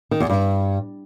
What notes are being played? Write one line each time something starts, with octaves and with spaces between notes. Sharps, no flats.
D#3
E2
G2